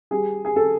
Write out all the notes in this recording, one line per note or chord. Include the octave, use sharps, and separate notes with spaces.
G3 G#4
G#4
A4